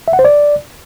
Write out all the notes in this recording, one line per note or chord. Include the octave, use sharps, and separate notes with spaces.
E5
F#5
C5
D5